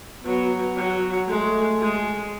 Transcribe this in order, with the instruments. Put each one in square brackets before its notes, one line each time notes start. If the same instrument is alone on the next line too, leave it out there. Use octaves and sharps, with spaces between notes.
[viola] F#3 [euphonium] B3
[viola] F#3
[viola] G#3 [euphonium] A3
[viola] G#3